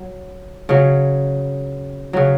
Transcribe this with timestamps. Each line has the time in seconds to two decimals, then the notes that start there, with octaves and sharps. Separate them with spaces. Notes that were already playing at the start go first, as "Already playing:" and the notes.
Already playing: F#3
0.69 C#3 F#3
2.13 C#3 F#3